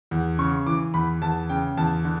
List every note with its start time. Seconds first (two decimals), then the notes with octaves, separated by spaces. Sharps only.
0.11 E2
0.39 C#3 C#6
0.66 E3 D6
0.94 E2 B5
1.22 E2 A5
1.50 C#3 G5
1.77 E2 A5
2.05 D3